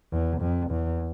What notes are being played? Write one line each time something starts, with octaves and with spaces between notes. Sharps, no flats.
E2
F2
E2